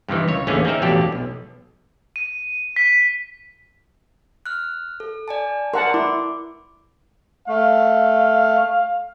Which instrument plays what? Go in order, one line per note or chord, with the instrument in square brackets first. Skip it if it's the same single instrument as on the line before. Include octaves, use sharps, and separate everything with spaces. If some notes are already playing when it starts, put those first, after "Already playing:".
[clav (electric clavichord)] G2 C3 D#3 E3
C#2 C#5
A1 D#2 D3 E3 C#4 G#4
C4 C#4 D#4 A#4 E5
A1 F2 B2 F#3 D4 G4
B1
[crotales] D#7
B6
[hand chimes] F6 F#6
A4
D5 G#5 A5
[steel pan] A#4 F#5 A5 [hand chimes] D5 C6
[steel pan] E4 [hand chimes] D6
[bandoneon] A3 [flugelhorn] F5